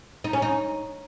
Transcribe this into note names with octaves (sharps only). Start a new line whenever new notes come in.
D#4
C#4
D#4